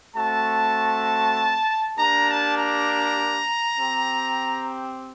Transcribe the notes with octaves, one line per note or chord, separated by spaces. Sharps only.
A3 C4 F#4 A5
A#3 D4 G4 A#5
A5
A#5
C4 G4